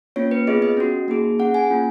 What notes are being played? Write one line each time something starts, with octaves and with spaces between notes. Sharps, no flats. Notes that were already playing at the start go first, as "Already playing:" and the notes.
A#3 C#4 F4 C#5
B4
B3 F4 G#4 D#5
D#5
C#4 F#4
A#3 D#4 G#4
C#4 G#4 F#5
G#5
A#3 C#4 F4